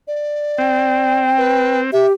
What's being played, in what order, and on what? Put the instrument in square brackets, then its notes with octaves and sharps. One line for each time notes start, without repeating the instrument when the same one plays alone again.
[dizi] D5
[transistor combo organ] C4 [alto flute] G5
[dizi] B4
[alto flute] G4 [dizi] E5